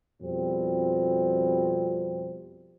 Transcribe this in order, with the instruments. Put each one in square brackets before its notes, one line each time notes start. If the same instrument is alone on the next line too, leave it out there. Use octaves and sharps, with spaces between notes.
[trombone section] F2 B2 G3 C4